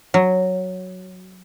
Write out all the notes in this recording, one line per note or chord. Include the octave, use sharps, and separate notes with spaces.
F#3